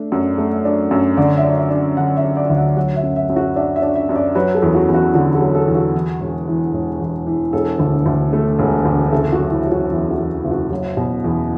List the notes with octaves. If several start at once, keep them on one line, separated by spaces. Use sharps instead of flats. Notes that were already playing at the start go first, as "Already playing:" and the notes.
Already playing: A3 D4
F#2
A3
D4
F#2
D3 D5
E5
D4
E5
D4
D3 F#5
E5
D4
D5
D2 E5
F#5
F#3 F#5
E5
F#2
E5
F#2
F#4
D4 E5
E5
D4
E5
F#2
D5
F#3 B4
A4
E2
F#4
E2
F#4
D3 F#4
A4
F#3
A4
E2
F#4
E3
E1
E3
E1
E2
E3
E1 A4
D2
D2
A3
E1
D2
F#1 A4
F#4
F#3
E4
F#3
F#4
E2
F#4
E2
F#1
F#4
F#3
B2
E2